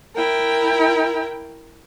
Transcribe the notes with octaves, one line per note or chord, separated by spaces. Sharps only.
E4 A#4 G5